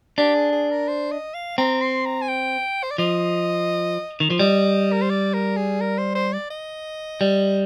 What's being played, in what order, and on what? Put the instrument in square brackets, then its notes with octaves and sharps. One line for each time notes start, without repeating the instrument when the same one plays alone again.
[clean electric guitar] D4 [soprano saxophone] G4
[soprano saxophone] G#4
G#4
A#4
C5
D#5
F5
[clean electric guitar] C4 [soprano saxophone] A#5
[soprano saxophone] C6
A#5
G#5
G5
C5
D5
[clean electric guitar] F3 [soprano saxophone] D#5
[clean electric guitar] D#3
F3
[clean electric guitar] G3 [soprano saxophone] D#5
[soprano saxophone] A#4
C5
D5
A#4
G#4
A#4
C5
C5
D5
D#5
[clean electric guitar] G3